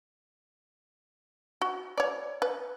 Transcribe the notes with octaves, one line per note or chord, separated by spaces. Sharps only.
F#4
C#5 D5
B4